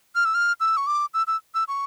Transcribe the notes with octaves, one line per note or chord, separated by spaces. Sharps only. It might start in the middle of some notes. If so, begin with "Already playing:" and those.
F6
E6
F6
E6
C#6
D6
E6
E6
E6
C#6